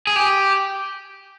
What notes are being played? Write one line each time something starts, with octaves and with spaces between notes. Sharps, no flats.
G#4
G4